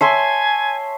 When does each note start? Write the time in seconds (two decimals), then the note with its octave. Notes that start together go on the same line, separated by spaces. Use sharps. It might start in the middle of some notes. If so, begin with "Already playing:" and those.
0.01 C#5 E5 G#5 A5 C6 C7